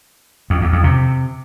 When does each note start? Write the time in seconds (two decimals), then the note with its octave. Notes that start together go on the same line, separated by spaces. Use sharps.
0.50 F2
0.61 E2
0.73 F2
0.84 C3